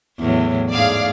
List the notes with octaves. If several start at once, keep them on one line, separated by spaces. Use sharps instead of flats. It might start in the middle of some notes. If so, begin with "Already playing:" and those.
E2 A2 F#3
G#2 A3 G#4 D5 F5